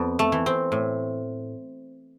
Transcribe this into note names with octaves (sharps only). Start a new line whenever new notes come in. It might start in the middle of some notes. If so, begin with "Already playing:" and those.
Already playing: F2 B3
A3
E3
C4
A2